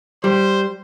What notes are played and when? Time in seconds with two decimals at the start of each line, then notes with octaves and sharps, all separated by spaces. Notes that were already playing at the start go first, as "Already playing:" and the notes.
0.24 G3 C5